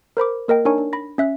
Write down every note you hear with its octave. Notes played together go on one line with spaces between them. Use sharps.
A#4 C5 B5 D6
A#3 A#4 D#5 G5
D4 D#4 A#4 C#5 G#5 C#6
D4
B5 A#6
C#4 E5 F#6